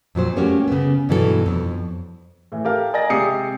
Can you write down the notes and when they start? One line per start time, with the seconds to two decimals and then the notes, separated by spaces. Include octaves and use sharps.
0.15 F2 A#2 F#3 C5
0.36 A3 A#3 C#4 F#4 G4
0.68 C#3 B3
1.09 G2 B2 E3 F#3 G4 A4
1.46 F2
2.52 A2 E3
2.65 G4 A4 A#4 F5
2.94 D5 D#5 G#5 A#5 A6 A#6
3.10 C3 G#3 G4 D#6 C7 C#7